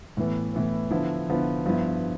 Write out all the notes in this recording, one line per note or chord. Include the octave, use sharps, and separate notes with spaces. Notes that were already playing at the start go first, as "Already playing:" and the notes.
A2 E3 B3
A2 E3 B3
D3 F3 B3 E4
D3 F3 B3 E4
G2 F3 B3 E4